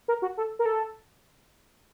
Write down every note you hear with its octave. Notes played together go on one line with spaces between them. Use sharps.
A#4
F#4
A4
A#4
A4